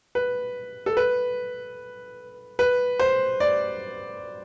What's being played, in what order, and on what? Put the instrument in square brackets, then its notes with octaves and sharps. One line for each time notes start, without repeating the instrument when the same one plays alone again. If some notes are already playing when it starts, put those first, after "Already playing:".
[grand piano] B4
A4
B4
B4
C5
D5